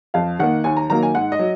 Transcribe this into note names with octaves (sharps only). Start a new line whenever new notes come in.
F2 F5
D#3 A#3 F#5
D#2 G#5
A#5
D#3 F#3 A#3 A#5
G#5
G#2 F#5
D#5
F#3